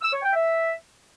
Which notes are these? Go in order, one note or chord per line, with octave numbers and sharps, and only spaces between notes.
E6
C#5
G5
E5